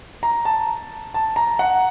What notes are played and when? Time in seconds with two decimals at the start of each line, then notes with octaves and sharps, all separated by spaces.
0.23 A#5
0.45 A5
1.14 A5
1.36 A#5
1.59 F#5